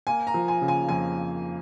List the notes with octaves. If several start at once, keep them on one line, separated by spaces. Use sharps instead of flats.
A#3 G#5
A#5
F3
G#5
C#3
G#5
F2 G#5